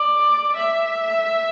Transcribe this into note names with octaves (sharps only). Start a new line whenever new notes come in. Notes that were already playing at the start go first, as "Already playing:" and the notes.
Already playing: D5
E5